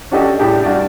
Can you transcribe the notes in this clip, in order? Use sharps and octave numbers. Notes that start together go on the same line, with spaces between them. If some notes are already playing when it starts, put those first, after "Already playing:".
C#4 D4 F#4 G4 A4 D#5
A2 D4 G4 G#4
G2 F#4 D5